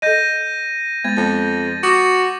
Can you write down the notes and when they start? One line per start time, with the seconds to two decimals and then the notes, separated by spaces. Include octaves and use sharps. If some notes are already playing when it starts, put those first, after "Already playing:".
0.02 A4 D#5 G6 A#6 D#7
1.05 G#3 B3 G#6 A6
1.17 F2
1.83 F#4 D6 D#6